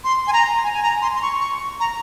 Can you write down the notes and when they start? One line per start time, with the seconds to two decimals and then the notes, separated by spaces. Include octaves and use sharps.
0.04 C6
0.27 G#5
0.33 A#5
0.63 G#5
0.74 G#5
0.83 A#5
1.02 C6
1.16 C6
1.22 C#6
1.41 C#6
1.80 A#5